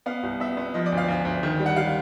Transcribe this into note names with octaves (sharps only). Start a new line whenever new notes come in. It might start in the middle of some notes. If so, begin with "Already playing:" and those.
B3 F5
C2
B3 E5
B3
F3 D#5
D5
D2
F5
D2
D2
D#3
G3
F#5
G3 F5